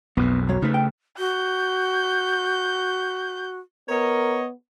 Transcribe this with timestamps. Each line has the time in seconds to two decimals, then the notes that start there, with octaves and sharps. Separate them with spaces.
0.17 B1 F2 B2 B3
0.49 F#3 C#5
0.62 C#3 A3 D#4 B4
0.74 G5
1.18 F#4 G6
3.89 B3 A#4 C#5 D#5